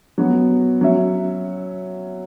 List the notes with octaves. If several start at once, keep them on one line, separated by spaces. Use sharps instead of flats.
F#3 B3 F#4
F#3 C#4 F#4 C#5 E5